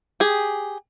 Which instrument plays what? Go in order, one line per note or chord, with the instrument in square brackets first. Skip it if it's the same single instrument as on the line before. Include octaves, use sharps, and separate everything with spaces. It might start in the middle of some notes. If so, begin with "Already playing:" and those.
[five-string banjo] G4 G#4